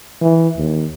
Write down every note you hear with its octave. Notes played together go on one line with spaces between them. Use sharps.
E3
D#2